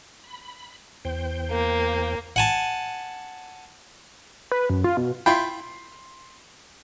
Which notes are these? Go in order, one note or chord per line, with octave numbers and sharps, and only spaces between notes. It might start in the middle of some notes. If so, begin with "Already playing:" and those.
B5
E2 C5 G5
A#3
F#5 G#5 A5
B4
F#2
F4
B2
E4 F4 G5 B5 C6